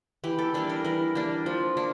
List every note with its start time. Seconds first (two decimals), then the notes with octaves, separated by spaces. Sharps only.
0.24 E3 G4
0.38 A4
0.54 G3 A#3 D4 A4
0.69 A#4
0.85 E3 A#4
1.15 G3 A#3 D4
1.46 F3
1.77 A#3 D4